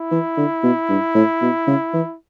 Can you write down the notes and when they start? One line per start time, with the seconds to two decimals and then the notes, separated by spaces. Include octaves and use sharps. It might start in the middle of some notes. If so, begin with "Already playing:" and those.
Already playing: E4
0.12 E3
0.37 D3
0.63 B2
0.89 G2
1.15 A2
1.42 B2
1.67 C#3
1.94 E3